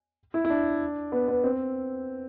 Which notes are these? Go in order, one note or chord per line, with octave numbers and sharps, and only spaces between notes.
E4
E4
D4
B3
B3
C4